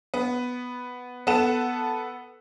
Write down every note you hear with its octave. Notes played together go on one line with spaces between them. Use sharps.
B3
B3 A4 F#5 E7